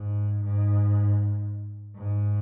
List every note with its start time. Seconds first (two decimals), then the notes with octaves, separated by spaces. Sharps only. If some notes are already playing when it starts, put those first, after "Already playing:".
Already playing: G#2
0.44 G#2
1.96 G#2